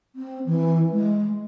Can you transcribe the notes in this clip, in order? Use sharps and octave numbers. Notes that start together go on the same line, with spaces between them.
C4
E3
G#3